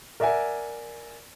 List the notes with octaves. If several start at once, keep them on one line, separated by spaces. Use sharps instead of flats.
A#4 D5 E5 F#5 G#5